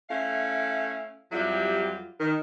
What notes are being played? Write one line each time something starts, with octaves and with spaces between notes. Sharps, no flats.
A3 C#4 E4 F5
F2 F#3 G3 E4 F4 G4
D#3